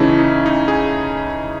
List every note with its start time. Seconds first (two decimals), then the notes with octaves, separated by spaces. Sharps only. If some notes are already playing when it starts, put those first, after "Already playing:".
Already playing: C#3 E3 A3 C#4 D#4 E4
0.19 D#4
0.46 D#4
0.68 G#4